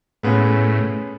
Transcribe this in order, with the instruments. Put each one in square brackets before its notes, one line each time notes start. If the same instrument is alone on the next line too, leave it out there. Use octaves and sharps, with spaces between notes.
[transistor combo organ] A2 [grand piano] G#3 B3 C#4